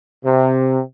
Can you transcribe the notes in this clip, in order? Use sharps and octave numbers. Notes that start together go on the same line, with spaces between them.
C3